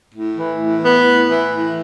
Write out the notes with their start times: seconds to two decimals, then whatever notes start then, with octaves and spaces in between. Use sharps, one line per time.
0.14 A2
0.37 E3
0.61 A2
0.84 B3
1.08 A2
1.31 E3
1.53 A2